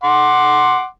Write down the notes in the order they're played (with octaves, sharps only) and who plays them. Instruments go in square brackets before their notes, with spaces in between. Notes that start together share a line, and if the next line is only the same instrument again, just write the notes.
[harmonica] F#5 C6 D6